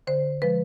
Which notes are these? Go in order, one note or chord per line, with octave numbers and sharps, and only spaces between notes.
D3 C5
F3 G#3 B4